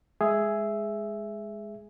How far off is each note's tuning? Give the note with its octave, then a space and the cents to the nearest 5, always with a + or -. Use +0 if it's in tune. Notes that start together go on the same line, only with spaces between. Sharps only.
G#3 +0 G#4 +5 E5 +0